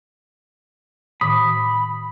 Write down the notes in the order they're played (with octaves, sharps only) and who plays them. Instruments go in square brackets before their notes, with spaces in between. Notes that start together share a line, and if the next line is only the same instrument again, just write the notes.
[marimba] A2 D#3 D6 [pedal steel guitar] B5 [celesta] D#6